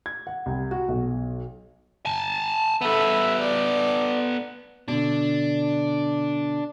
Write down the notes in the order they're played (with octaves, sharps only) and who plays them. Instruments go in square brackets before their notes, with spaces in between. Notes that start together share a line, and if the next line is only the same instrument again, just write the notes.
[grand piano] G#6
F#5
C2
F#4
B1
[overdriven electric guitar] G#5 A5
[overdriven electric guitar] B3 A4 [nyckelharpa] E5 B5
[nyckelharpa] D5
[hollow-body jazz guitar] B2 D3 [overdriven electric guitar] D4